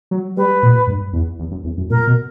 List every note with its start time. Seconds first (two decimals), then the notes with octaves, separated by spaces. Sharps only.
0.11 F#3
0.37 G3 B4
0.63 A#2
0.87 G2
1.13 E2
1.39 E2
1.51 F#2
1.64 E2
1.77 F#2
1.90 A#2 A#4
2.07 B2